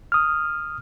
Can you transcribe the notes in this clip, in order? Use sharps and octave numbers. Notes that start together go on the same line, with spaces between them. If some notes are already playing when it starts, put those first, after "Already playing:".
D#6 F6